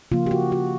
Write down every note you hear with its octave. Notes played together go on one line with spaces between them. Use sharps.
C#3 F3 A#3 F4
G4
F#4
F#4